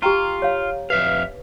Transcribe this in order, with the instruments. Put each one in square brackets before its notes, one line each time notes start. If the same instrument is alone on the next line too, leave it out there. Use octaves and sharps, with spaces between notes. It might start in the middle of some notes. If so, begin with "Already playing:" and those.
[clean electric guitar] F4 [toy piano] G4 G5 A#5
[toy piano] C#5 F5
[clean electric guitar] F2 E5 F5 [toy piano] B4